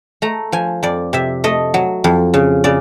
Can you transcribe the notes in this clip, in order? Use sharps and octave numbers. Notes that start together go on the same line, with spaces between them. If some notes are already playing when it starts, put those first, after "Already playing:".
A3 A#5
F3 G#5
F2 D5
C3 E5
A3 D#5
F#3
F2
C#3
C#3 D5